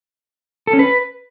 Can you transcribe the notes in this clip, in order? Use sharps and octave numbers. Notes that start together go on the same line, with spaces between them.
A4
C#4
B4